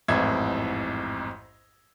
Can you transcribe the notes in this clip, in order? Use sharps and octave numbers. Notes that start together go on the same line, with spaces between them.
A1 F2 G#2 E4 G#6